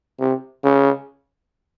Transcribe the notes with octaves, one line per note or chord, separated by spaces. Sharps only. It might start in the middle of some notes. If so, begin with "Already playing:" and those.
C3
C#3